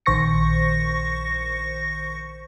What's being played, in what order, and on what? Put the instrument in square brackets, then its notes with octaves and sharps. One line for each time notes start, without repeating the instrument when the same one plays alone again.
[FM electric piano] A#1 D#3 C5 C#6 A#6 C#7